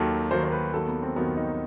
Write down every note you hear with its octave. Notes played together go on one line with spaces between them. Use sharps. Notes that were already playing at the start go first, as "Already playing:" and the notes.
Already playing: D#2 D#3 F#3 A4
D#2 D#3 F#3 C5
C5
B4
D#2 D#3 F#3 A4
B3
C4
D#2 D#3 F#3 B3
D#4